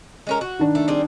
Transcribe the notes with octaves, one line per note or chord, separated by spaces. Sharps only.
G#3 C#4 A#4
F#4
D#3 D4
A3
G3 C4 G#4